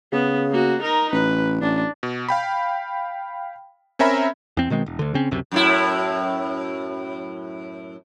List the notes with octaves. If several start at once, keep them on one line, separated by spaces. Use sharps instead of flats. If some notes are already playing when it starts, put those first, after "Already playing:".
C#3 B3
A#3 F#4
D#4 A#4
A1 B4
A1 D4
B2
F5 G5 B5
C4 C#4 A#4 E5 A#5 B5
E2 C4
B2 D#3 G#3 C4
E1
D2 D3
C#3 C4 C#4
C#2 F#2 C3
F#2 A2 E4